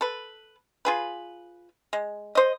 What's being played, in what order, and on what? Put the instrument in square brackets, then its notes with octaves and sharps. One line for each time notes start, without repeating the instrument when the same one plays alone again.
[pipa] A4 B4
F4 G#4 B4
G#3
C5 D#5